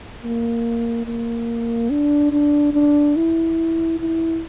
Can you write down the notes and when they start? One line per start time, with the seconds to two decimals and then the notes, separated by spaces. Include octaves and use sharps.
0.23 A#3
1.05 A#3
1.90 D4
2.32 D4
2.73 D4
3.16 E4
3.99 E4